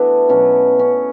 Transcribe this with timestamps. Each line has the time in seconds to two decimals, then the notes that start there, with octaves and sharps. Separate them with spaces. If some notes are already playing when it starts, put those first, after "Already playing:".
Already playing: E3 A3 B3 D4 E4 F#4 A4
0.29 B2 F#3 A3 C#4
0.79 C#4